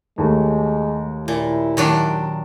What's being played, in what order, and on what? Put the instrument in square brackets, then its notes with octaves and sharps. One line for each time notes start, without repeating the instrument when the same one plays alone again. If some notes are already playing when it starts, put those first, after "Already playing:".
[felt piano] D#2 A3 [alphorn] G#3
[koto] A#2 [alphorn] E4
[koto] D#3 F#3 D4